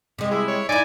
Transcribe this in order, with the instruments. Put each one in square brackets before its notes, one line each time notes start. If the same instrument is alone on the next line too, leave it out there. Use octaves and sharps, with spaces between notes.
[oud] C3 G#3
[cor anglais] E4 [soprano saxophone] G#4
[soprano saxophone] C#5
[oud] D#4 E4 [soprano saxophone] D5 [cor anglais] G#5